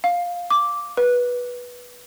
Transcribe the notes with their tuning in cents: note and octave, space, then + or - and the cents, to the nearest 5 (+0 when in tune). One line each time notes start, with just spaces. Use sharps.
F5 +10
D6 -5
B4 -15